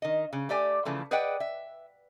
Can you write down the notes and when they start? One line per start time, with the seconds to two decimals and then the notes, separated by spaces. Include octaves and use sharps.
0.02 D#3 D#5
0.33 C#3
0.49 A3 G4 D5 G#5
0.85 C#3 E3 F3 A3
1.11 G#4 B4 D5 D#5 F#5 G5
1.40 E5